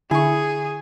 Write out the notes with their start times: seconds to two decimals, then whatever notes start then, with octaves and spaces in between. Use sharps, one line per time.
0.11 D3 E4 G#4 G#5 C#6